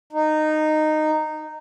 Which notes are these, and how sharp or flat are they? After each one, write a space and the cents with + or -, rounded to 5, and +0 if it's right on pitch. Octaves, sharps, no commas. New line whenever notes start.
D#4 -15